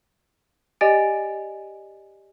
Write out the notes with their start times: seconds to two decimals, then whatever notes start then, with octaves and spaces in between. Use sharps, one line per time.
0.81 G4 D5 D#5 G#5 A6 D7